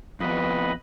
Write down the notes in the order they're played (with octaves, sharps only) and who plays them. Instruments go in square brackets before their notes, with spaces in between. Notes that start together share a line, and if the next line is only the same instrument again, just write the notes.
[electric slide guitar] F2 B3 [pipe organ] B4 D#5 B5